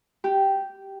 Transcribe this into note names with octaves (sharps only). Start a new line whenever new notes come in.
G4